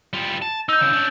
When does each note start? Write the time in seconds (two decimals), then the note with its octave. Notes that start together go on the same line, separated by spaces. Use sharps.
0.13 G3 F4
0.42 A5
0.69 D#4 E6 G6
0.81 C#3 E3
0.93 C#4 D4